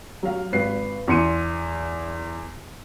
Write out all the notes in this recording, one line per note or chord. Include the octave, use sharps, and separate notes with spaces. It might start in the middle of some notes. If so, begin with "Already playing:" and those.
F#3 F5
G#1 B4 C7
E2 C6 C#7 D#7